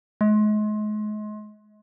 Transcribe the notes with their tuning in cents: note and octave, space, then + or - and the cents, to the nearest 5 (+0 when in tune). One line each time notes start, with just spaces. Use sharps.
G#3 +35